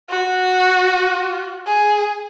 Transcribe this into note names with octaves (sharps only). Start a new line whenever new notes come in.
F#4
G#4